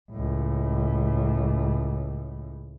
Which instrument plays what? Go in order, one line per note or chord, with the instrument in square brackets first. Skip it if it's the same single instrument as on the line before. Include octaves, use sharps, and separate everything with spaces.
[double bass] C#2 A2